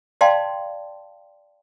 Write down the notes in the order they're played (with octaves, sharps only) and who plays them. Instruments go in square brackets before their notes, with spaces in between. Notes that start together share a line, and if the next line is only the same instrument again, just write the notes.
[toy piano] D5 F5 G5 A5 C6